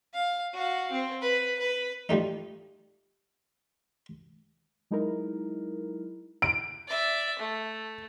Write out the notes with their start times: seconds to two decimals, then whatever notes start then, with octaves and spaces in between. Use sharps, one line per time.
0.14 F5
0.54 F#4 F5
0.92 C4
1.22 B4
1.59 B4
2.09 F3 G3 A3 D#4
4.91 F#3 G#3 D#4 E4 A#4
6.42 D7
6.87 D5 E5
7.39 A3